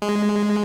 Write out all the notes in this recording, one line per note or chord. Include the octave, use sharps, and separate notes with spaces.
G#3